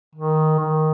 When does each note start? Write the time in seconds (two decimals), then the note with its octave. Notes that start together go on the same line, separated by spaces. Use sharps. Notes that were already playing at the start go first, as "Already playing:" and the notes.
0.15 D#3
0.59 D#3